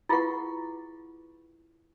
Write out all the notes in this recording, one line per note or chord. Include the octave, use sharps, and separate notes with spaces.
E4 F4 G#4 B4 F#5 C#6